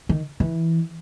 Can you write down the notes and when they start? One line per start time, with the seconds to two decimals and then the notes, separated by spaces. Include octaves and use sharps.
0.09 D#3
0.40 E3